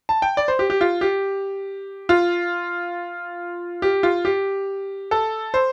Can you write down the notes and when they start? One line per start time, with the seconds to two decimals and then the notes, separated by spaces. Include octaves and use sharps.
0.09 A5
0.22 G5
0.37 D5
0.48 C5
0.59 G4
0.70 G4
0.81 F4
1.01 G4
2.09 F4
3.82 G4
4.03 F4
4.25 G4
5.11 A4
5.54 C5